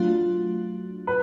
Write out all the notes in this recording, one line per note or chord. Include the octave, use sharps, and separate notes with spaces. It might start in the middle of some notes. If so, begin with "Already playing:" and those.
Already playing: F#3 A3 D4 F4 F#4
B4